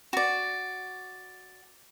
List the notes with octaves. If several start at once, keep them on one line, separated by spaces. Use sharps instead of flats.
F#4 D5